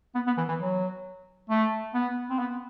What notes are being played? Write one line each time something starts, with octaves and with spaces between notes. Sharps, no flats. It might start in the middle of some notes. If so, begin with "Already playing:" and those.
B3
B3
E3
E3
F#3
A3
B3
C4
B3